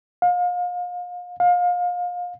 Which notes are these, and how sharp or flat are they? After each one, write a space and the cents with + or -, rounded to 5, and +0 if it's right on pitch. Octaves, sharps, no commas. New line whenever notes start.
F5 +35
F5 +30